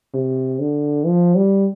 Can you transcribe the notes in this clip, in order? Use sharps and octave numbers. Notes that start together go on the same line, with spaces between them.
C3
D3
F3
G3